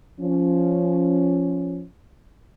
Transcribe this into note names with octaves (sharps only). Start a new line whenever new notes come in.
F3 C#4